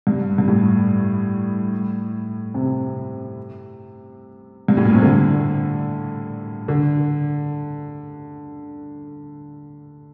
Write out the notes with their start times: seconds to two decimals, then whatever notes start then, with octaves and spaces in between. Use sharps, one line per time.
0.07 G2
0.38 G2
0.48 A2
2.54 C3
4.68 G2
4.77 A2
4.85 A#2
4.94 C3
5.02 D3
6.68 D3